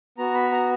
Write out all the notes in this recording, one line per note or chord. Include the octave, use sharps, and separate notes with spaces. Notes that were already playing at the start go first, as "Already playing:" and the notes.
B3 F#4 A#5
B5
A#5